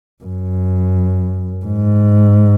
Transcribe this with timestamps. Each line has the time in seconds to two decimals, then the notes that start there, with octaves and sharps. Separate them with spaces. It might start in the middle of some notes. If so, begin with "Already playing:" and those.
0.24 F#2
1.65 G#2